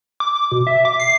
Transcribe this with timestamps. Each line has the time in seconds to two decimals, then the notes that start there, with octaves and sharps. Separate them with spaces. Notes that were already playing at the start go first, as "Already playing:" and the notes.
0.20 D6
0.52 B2
0.67 E5
0.85 D6
1.00 C7